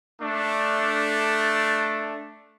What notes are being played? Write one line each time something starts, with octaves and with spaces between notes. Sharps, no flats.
A3 D4